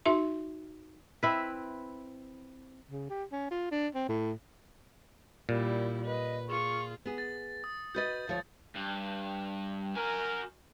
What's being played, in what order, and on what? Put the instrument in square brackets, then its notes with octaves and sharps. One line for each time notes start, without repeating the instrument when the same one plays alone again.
[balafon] D#4 F#4 E5 C6
[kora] C4 E4 B4
[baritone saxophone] C#3
G4
C#4
F4
D4
C4
A2
[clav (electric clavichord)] A#2 [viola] G3 E4
[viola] B4 [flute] D#5
[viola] F4 G#4 [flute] C#6
[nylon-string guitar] B3 G#4
[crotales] A6
D#6
[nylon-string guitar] F#4 B4 D#5 [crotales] G6 A6
[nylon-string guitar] D2 F3 C#5
[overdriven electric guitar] G2
[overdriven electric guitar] F#4 G#5 [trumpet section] A#4